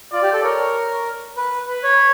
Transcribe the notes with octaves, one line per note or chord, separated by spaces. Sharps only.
F4 D5
G4
A4
A#4 C#5
B4
B4
C#5